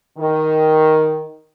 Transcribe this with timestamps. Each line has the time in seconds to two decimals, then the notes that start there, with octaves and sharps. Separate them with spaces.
0.19 D#3